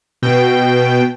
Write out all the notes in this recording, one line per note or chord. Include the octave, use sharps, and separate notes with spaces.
B2 G5